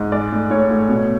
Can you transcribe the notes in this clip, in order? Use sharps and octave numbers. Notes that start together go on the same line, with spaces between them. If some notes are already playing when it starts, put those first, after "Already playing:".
Already playing: G#2
G#3 D5
A2
A2 C#5
A2
B2